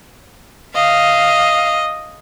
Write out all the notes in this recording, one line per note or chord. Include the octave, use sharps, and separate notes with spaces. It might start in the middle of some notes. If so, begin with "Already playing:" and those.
D#5 F5